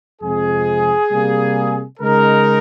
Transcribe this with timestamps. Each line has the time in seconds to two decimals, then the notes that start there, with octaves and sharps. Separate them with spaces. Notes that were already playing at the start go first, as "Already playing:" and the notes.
0.22 F2 C3 F3 G#3 G#4
1.11 C3 G3 A#3
2.00 C#3 G#3 D#4 A#4